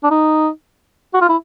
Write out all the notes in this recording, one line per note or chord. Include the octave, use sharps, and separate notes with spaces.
D4
D#4
F#4
F4
E4